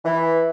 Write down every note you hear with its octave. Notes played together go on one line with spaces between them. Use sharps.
E3